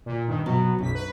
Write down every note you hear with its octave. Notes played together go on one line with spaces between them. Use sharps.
A#2
G2 D#3
B2 F#3
B1 F#2 B6
B4